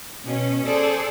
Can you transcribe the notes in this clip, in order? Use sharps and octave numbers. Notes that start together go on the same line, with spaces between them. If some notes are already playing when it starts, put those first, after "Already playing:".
B2 C#4
G#4 A4 C5 D5